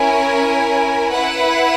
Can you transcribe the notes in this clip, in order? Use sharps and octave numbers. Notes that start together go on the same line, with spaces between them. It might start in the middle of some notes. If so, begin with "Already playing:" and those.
Already playing: C#4 E4 A#4 C#5 G#5
E4 B4 F#5